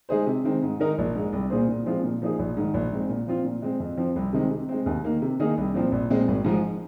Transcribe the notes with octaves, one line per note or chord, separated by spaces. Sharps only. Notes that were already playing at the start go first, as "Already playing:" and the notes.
G#3 D#4 G#4 C5
C3
D#3 G#3 C4
G#2
D#3 G#3 D#4 A#4
A#1
G#2 G#3
C2
A#2 A#3 G#4 C5
A#2
F3 G#3 C4 F4
A#2
F3 A#3 D#4 G#4
A#1
G#2 D#3
A#1
G#2 G#3 C4
A#2
F3 C4 F4
A#2
G#3 C4
F2
F3 C4
C2
C3 D#3 G#3 C4
C3
G#3 C4
D#2
D#3 A#3
C3
D#3 A#3 D#4 G#4
C2
A#2 F3 C4
A#1
A#2 G#3 C4
G#1
G#2 F3 G#3